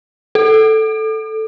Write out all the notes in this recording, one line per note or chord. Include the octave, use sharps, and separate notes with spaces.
A4